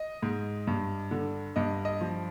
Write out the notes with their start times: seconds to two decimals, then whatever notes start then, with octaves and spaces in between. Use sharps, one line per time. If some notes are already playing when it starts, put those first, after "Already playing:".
Already playing: D#5
0.23 G#2
0.67 G2
1.11 D3
1.56 G2 D#5
1.85 D#5
2.01 F3